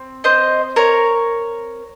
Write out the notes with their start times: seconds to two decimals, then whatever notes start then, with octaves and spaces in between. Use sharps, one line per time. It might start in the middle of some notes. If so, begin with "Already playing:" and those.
Already playing: C4
0.24 C5 D#5
0.76 A#4 C#5